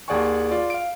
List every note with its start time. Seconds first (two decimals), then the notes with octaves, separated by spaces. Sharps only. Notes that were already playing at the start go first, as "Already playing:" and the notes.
0.08 D#2 G#4 D5 F#5 G#5 C#6
0.51 F4 D5
0.70 F5 D7